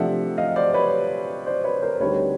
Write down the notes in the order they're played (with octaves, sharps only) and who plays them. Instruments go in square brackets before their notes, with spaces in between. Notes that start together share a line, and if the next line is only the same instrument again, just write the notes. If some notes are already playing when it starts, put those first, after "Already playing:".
Already playing: [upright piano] C3 F3 A3 D4 E5 F#5
D#5 F5
C5 D5
B4 C#5
C5 D5
B4 C#5
A#4 C5
D2 D3 G3 C4 D#4 B4 C#5